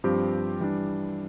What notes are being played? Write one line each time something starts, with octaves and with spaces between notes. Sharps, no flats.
G2 F3 C4 G4
E3 G3 D4